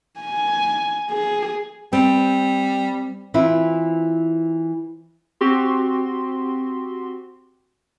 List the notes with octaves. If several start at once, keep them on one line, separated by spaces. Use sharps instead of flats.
G#5
G#4
G3 C4
E3 C4 E4 F4
C4 F#4 G4 C6